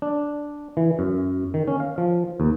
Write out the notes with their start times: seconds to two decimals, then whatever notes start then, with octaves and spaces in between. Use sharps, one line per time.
0.02 D4
0.77 E3
0.99 F#2
1.54 D#3
1.68 C#4
1.80 F5
1.98 F3
2.40 D#2